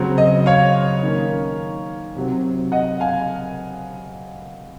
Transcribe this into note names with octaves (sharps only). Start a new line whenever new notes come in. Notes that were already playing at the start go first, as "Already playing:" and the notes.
Already playing: C#3 F#3 C4
D#5
C#5 F5
D#3 A#3 C#4
C3 F#3 C4
D#5 F#5
F5 G#5